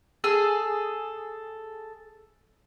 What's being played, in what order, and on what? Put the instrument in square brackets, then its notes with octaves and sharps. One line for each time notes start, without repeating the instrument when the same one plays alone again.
[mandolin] G#4 A4 E6